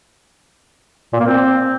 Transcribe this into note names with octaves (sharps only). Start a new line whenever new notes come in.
A#2
A#3
C4